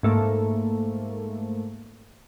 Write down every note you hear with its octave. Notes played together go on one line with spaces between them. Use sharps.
G#2 A3 A#3